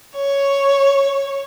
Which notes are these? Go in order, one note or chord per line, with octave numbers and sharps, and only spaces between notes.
C#5